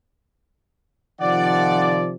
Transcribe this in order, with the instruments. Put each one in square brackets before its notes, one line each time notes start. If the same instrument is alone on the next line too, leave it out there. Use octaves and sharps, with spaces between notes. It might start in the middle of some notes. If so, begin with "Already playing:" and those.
[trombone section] C3 D#3 F3 [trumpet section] D5 [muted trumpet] F#5